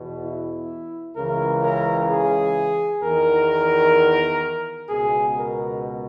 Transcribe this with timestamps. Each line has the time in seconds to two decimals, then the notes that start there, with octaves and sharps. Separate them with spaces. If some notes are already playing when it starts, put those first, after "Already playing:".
Already playing: E2 B2
0.22 E4
1.16 C#2 C#3 E3 A#4
1.62 A#4
2.09 G#4
3.03 E2 D#3 A#4
4.89 C#2 B2 G#4
5.36 A#4